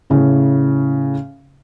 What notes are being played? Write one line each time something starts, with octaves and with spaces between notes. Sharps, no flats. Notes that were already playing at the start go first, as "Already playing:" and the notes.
A2 C#3